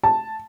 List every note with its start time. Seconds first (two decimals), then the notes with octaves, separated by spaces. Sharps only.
0.03 A5